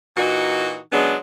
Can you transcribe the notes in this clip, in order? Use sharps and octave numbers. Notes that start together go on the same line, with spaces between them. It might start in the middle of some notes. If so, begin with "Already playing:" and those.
A#2 E3 D#4 F#4
C#3 F#3 G#3 B3 D4